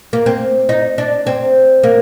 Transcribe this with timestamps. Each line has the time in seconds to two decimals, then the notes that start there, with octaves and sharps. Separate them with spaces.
0.13 A#3
0.26 C4
0.69 D#4
0.98 D4
1.27 C4
1.83 A#3